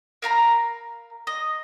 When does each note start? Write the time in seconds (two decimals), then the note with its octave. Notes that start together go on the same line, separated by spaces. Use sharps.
0.22 A#4 F5 A#5 B5
1.27 D#5